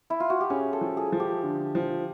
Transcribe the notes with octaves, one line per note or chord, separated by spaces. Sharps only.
E4
F4
F#4
G4
C#4 G#4
A4
F3
G#4
F3
G4
D3
F3